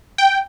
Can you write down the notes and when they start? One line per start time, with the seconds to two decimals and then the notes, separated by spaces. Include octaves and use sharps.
0.18 G5